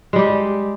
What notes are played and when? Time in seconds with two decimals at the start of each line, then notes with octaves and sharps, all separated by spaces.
0.13 G#3
0.16 G3
0.18 G4